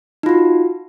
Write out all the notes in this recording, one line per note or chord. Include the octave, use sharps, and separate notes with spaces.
D#4 F4 F#4